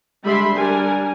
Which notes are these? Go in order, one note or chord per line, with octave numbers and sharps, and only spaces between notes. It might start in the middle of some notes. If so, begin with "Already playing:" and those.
D3 G3 G#3 E5 B5 C6
G3 D4 A#4 G#5